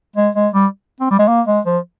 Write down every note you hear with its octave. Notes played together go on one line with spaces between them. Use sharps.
G#3
G#3
G3
C4
G3
G#3
A#3
G#3
F3